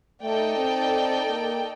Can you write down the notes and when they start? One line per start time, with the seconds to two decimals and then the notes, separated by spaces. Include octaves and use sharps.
0.22 A3 D#4 A4 D5 G5
0.57 C4
1.28 A#3